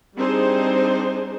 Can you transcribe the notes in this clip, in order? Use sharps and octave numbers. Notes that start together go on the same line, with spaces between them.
G3 C4 D4 D#4 G#4 C5